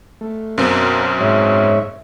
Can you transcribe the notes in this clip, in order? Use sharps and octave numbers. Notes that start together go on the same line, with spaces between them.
A3
F#2 B2 C4 A#4 F5
G#2 C#5 E5